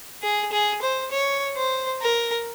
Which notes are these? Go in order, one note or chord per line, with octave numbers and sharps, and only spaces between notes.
G#4
G#4
C5
C#5
C5
A#4